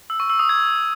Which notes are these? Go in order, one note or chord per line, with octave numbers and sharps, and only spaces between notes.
E6
C#6
E6
D#6
G#6